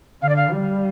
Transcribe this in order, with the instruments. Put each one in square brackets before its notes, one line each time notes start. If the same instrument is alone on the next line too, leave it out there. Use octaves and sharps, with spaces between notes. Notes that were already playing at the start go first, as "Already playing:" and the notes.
[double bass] D3 [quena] F5
[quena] D5
F5
[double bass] G3